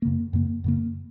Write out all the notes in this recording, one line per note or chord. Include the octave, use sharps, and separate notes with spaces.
F#2 C#3 A#3
F#2 C#3 A#3
F#2 C#3 A#3